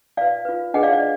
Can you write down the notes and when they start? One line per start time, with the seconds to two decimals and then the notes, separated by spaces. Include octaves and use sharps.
0.17 F4 B4 D5 F5
0.45 F4 B4
0.74 D4 G#4 B4 D#5 F#5
0.83 D5 F5
0.93 D5